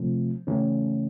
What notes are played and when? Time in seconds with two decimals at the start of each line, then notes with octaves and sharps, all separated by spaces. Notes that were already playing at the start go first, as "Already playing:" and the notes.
Already playing: C3 F3 A3 C4
0.47 C#3 E3 A3 C#4